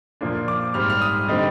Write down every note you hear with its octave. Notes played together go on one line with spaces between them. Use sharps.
A#2 F3 A#3 D4
D6
G#2 G3 C4 F6
F6
D#6
D3 G3 C4 D#4